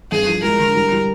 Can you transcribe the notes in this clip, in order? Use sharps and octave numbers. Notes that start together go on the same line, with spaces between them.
G2 G#4
F3
G#3 A#4
D3
G3
G3